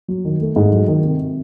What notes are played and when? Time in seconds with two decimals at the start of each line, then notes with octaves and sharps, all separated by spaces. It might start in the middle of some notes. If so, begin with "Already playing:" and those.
0.08 F#3
0.25 D#3
0.41 A3
0.56 G#2
0.72 F#3
0.88 D#3
1.04 C3